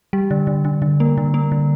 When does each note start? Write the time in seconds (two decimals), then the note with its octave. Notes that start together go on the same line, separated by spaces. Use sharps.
0.13 G3
0.31 D3
0.47 D3
0.65 D3
0.82 D3
1.00 A#3
1.18 D3
1.34 A#3
1.52 D3